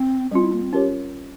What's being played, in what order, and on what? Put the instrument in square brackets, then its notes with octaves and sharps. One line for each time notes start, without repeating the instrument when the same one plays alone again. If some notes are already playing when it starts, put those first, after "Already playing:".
Already playing: [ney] C4
[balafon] G3 C4 F4 [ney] C#4
[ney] E4
A#3
C4
[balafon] C#4 F4 A#4 C#5 [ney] G4